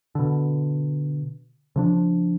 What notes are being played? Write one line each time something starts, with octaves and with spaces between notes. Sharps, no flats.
B2 D3
C#3 F3 D4